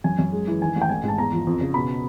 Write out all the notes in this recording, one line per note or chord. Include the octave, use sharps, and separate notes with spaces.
F#2 G#5
F#2
G#3
E3
D#3 G#5
A1
G5
A1 G#5
G#2 A5
E2 A#5
F3
F2
C#3
B2 B5